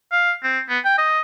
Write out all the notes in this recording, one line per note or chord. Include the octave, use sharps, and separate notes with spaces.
F5
C4
B3
G5
D#5